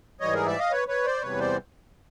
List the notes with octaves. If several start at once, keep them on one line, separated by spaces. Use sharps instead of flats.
G#2 E3 G3 C#5 D#5
G#4 A#4
D5 E5
D#5 F5
B4 C#5
B4 C#5
C5 D5
E2 C3 E3 G3 B4 C#5
C5 D5